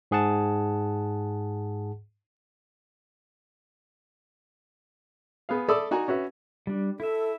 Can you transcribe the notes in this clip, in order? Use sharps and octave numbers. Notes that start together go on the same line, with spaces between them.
G#2 G#4 F#5 A5
B3 G#4 F5
A4 D5 E5 B5 D#6 E6
D#4 F#4 D5 G#5 A#5
C#4 F#4 B4 E5
G3 D4
E4 A4 E5